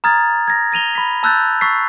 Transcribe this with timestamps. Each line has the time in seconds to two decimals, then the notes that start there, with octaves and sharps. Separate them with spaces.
0.04 A#5 D#6 F6 G#6 A6 F7
0.48 G#6 A#6
0.72 A#6 D#7 F7 G7
0.95 B5 B6
1.23 A5 E6 F#6 G6 A6
1.61 C#6 E6 A6 B6 C7